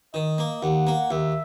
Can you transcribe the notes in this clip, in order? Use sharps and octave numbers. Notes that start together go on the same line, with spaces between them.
D#3 D#5
A#3
D#2 F#5
A#3
D#2 E5